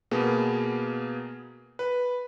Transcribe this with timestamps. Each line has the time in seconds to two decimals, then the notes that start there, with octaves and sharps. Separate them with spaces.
0.11 B2 A#3 B3 G#4
1.79 B4